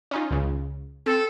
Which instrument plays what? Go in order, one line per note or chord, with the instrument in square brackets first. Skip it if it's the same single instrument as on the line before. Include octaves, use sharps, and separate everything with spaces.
[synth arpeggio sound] C#4 D#4 F4
C#2 C#3
[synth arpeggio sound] C4 [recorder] A4